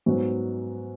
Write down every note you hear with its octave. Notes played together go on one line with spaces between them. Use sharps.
G#2 F#3 B3